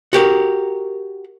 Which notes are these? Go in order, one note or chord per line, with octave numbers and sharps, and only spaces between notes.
F#4 G4 A#4